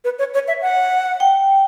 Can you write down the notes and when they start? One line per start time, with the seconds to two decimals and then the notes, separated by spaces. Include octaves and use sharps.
0.04 B4
0.19 C#5
0.34 C#5
0.48 E5
0.62 F#5
1.20 G5